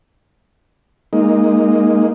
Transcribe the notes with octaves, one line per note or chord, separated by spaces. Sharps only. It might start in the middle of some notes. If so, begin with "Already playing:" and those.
G#3 A#3 D#4